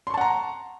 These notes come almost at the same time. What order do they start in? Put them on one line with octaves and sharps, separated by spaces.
C6 C#6 A5 F#5 A#5